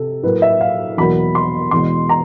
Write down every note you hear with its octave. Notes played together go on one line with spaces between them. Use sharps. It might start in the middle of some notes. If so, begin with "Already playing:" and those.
Already playing: C3 A4
A2 F#3 A#3 B4
E5
F5
E2 B2 F#3 A#3 B5
C6
E2 B2 G#3 C6
A#5